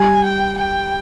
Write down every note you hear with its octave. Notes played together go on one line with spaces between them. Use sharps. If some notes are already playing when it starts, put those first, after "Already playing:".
Already playing: G3 G#5
G5
G5